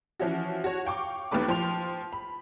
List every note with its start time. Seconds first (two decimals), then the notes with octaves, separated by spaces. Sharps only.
0.20 E3 F3 C#4 E4 F#4
0.64 F#4 C#5
0.85 F5 G5 C#6 D6
1.31 D#2 D#3 A3 B4 D6
1.48 F3 G5 C6 F7
2.13 B5